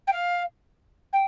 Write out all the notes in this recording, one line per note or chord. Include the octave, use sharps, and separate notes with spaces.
G5
F5
G5